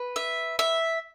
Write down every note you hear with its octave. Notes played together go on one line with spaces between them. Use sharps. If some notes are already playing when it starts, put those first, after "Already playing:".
Already playing: B4
E5
E5